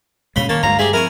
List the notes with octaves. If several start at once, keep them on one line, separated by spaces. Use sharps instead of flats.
G2 A#2 C#3 G#3 B5 C6
D#3 A#3 C#5 A5
D2 G2 G#3 A3 F5 A#5
G4 G#4 C5 E5
F3 C4 E4 A#4 G#5 C#6